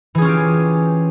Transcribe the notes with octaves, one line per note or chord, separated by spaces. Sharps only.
E3 C#4 F4 G4 G#4